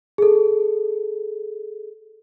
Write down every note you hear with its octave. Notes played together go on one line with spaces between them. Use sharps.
G#4 A4